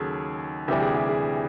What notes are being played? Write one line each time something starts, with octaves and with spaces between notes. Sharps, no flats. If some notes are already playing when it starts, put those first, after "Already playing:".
Already playing: D#2 C#3 F#3 G#4 A4
D2 C3 E3 G3 G4
G#4
G4
G#4